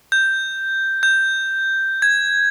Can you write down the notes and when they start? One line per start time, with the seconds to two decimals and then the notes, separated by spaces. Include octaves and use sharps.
0.12 G6
1.03 G6
2.02 G#6